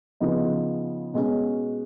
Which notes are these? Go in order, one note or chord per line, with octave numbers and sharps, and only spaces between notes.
C#3 F3 B3 D#4
B2 G#3 C#4